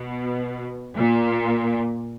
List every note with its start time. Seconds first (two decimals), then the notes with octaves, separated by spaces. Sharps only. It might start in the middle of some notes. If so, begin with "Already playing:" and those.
Already playing: B2
0.96 A#2